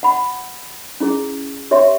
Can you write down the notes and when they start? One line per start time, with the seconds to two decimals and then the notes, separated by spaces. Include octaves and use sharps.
0.03 F#5 B5
1.00 C#4 E4 G#4
1.71 G4 C#5 E5 G5 C6